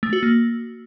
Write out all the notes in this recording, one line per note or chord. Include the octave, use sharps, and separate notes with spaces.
A3
F#4
A#3